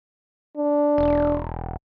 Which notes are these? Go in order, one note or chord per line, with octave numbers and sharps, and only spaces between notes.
D4
E1